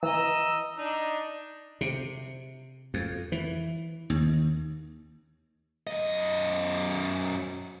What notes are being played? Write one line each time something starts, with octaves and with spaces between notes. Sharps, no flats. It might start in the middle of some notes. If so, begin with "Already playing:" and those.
E3 D#5 A#5 E6
D4 D#4
C3
F2
E3
D#2
F#2 D#5